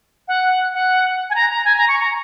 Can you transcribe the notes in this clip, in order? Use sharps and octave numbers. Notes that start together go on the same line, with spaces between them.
F#5
F#5
G#5
A#5
A#5
G#5
A#5
C#6
A#5